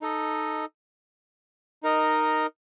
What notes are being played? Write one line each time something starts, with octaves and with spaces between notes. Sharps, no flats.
D#4 A4 D#5
D#4 A#4 D#5